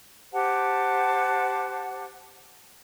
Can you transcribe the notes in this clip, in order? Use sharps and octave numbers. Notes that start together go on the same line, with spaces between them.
G4 C5 F#5 A5